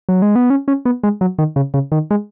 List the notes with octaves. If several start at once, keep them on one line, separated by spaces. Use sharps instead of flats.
F#3
G#3
B3
C#4
C#4
B3
G#3
F#3
D#3
C#3
C#3
D#3
G#3